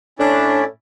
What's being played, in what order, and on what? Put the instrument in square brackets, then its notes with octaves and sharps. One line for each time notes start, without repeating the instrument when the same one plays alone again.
[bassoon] A2 [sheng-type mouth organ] C#4 E4 D5 [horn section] D4